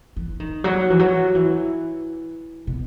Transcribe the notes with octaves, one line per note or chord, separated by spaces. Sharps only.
E3
D#3
F#3
E3
F#3
E3
B2